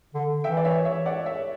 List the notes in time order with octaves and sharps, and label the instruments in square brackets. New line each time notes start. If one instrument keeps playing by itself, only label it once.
[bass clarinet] D3
[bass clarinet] E3 [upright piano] E5 G5
[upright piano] D5
C#5 E5
C#5 E5
D5 F#5
C#5 E5